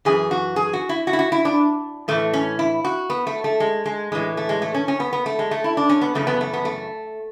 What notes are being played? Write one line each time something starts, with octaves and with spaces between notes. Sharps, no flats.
F#2 E3 G#4
F#4
G#4
F#4
E4
F#4
E4
F#4
E4
D4
A2 E3 A3
C#4
E4
F#4
B3
A3
A3
G#3
G#3
A2 E3 G#3
A3
G#3
A3
C#4
C#4
B3
B3
A3
G#3
A3
E4
D4
C#4
B3
F#2 C#3 E3 A3
B3
A3
B3
A3